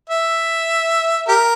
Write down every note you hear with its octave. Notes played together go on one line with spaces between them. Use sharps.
E5
G4 A#4